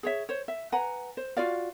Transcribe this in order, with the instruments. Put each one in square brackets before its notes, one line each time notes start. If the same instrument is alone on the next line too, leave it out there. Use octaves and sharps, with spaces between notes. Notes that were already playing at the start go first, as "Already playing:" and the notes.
[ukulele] G#4 C#5 E5
C5 C#5
E5
B4 F#5 G#5 A#5
C5
F4 F#4 D5 F5